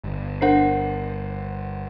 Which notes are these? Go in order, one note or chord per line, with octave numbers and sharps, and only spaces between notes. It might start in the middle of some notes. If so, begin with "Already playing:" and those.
G1
D4 A#4 C5 F#5 C7